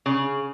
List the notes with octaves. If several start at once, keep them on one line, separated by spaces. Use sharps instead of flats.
C#3